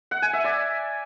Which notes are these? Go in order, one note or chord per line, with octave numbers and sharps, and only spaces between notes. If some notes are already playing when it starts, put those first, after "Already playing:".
F#5
G#5
E5
D5